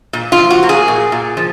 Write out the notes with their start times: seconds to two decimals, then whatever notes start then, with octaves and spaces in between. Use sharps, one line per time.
0.13 A#2
0.32 F4
0.38 F3
0.50 F#4
0.63 A#3
0.69 G#4
0.88 A#2
1.12 A#2
1.37 F3